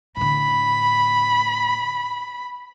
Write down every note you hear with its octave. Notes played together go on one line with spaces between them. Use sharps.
A2 D3 B5